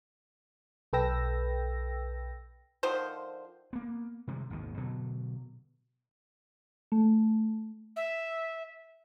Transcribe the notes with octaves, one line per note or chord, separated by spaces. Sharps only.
B1 A4 B4 G5 E6 A#6
D3 D#3 F3 C5
A#3 B3
C3 D#3 G3 G#3
G#1 D#2 B2 D#3
B2 D3 F3 F#3
A3
E5